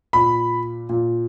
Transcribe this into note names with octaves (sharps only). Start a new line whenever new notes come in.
A#2 B5
A#2